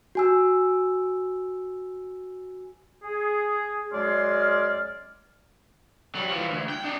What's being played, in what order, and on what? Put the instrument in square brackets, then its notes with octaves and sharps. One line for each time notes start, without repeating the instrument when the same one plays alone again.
[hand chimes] F#4 G#5 E6
[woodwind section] G#4
F#2 G#3 G#4 D5 C6 F6
[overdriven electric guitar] F#3 G3
E3 F3
D2
G5
D4 D#4